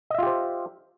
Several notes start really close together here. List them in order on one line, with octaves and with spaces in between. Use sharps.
D#5 E5 F4 G4 C5